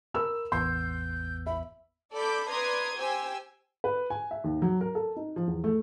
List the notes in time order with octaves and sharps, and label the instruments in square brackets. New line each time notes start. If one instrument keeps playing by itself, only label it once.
[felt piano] A#4 B5 E6
[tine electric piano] A1 E2 B3 [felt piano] C6 [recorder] G6
[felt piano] E5 [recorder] B5
[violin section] A4 D5 B5 D6 G6
B4 D5 A#5 C6 D#6 G#6
G4 C5 G5 G#5 E6
[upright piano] B4
G#5
E5
D#2
F#3
A#4
A4
D#4
F3
E2
A3